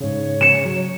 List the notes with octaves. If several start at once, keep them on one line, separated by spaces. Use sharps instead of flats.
G#2 C#3 C#5
C#3 C#7 E7
F#3